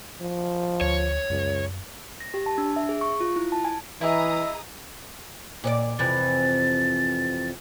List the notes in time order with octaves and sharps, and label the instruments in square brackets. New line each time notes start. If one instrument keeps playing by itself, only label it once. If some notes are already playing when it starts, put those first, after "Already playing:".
[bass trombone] F3
[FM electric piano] D2 [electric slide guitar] C#5
[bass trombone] C#2 [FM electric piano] F#2
[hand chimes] A#6
G4
A5
D4
E5
G#4
C#6
F4
E4
A5
G#5
[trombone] E3 [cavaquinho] E4 [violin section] G#4 A#5 D#6 [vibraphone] D#5 E6
[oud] A#2 C#5 D5
[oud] F2 C3 E3 [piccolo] A6